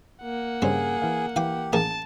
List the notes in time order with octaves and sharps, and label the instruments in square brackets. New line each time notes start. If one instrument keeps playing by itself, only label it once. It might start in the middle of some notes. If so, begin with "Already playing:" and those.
[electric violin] A#3 F#5
[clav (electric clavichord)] G2 C#3 [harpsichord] G3 C4 [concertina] G#4
[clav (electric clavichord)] E3 F5
[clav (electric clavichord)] E3 [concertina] G4 [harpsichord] F5 G5 D6
[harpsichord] A1 G#4 A#4 [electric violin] A5